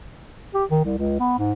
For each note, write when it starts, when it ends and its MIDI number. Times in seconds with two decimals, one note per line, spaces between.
0.54 0.64 67
0.71 0.82 51
0.85 0.95 36
0.98 1.19 37
1.20 1.37 59
1.38 1.53 44